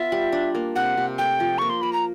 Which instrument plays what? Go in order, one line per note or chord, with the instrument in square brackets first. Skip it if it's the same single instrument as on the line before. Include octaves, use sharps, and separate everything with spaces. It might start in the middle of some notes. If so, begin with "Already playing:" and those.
Already playing: [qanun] B3 F4 [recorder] E5
[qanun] G3
D4
A#3
[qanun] C3 [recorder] F#5
[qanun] C3
[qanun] A3 [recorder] G5
[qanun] F3
[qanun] A#3 [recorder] C#6
[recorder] C6
[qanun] A#3 [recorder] B5
[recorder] A#5